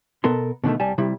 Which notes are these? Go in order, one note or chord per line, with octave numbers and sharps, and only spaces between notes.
B2 B3 A4 A#4 C6
B2 D3 D#3 A3
C2 G3 G#5 A5
C3 G3 E4